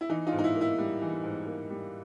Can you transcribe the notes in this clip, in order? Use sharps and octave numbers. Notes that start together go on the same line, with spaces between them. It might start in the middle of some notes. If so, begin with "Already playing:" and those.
E4
E3 D#4
D#4 F4
G#2
D#4
E4
A#3
E4
G3
E3
G#2
A#3
G3